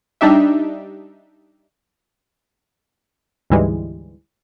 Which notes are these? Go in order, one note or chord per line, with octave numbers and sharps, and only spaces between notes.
G3 D4 D#4 G4 E5
D2 G#2 E3 G3 G#3